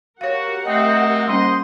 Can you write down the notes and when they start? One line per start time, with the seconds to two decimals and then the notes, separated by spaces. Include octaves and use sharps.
0.21 F#4 G4 A#4 C#5 F5 F#5
0.66 A3 C4 D#5 G5
1.28 G3 A#3 C#4 C5 D#5 C6